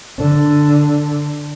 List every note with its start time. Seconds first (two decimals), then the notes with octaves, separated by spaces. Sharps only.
0.19 D3